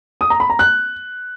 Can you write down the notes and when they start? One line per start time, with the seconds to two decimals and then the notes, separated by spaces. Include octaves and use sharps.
0.21 D#6
0.30 A#5
0.40 B5
0.50 A#5
0.59 F#6